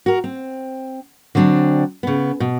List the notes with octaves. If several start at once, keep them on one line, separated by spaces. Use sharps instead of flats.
F#4 A#4
C4
D3 F#3 C4 D4
C#3 B3
B2